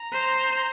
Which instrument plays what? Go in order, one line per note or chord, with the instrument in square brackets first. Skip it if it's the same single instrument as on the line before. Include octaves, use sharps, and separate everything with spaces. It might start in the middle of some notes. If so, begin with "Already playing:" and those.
Already playing: [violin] A#5
[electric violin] C5